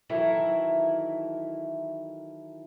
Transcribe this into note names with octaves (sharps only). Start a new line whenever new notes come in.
D#3 E3 F#3 E4 A4 A#4